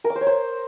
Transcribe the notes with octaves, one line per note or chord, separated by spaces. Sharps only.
A#4
D6
C5
C#5
C5